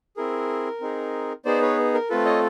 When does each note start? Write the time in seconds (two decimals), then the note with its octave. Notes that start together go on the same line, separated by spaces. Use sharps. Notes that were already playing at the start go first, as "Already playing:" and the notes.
0.17 C4 E4 G#4 A#4
0.81 C4 D#4 G#4
1.45 B3 D#4 G#4 C5 D5
1.62 B4 C#5
1.94 A#4
2.09 A3 C4 F4 A4 B4
2.25 C#5 D#5